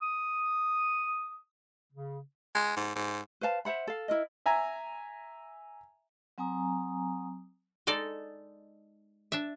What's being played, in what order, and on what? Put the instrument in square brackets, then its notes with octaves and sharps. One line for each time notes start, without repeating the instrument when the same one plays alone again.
[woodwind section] D#6
C#3
[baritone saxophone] G#3
G#2
G#2
[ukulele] B4 C5 F5 A5
C5 E5 F#5 B5
A4 F5
E4 A#4 D#5
[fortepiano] E5 G#5 A#5
[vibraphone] F#3 C4 G#5 A#5 D#6
[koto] G#3 D#4 A4 D5
D4 E5